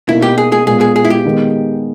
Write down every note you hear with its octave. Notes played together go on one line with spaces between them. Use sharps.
B2 A#3 D#4 E4
G4
G#4
G#4
A#2 G#3 B3 G#4
G#4
G#4
E4
G4
D#3 G#3 B3